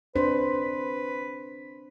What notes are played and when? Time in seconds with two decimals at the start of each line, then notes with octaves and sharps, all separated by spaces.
0.16 C4 D4 B4 C5